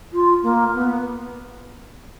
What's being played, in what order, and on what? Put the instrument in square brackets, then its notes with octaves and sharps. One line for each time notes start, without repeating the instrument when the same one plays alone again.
[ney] F4
A#3
B3